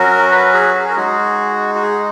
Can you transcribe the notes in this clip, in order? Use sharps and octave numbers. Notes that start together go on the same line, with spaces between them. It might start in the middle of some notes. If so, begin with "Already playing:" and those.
Already playing: F#3 C#4 F#4 A#4
B4
G#4
G#4
A#4
G#3 D#4 F#4 G#4
F#4
G#4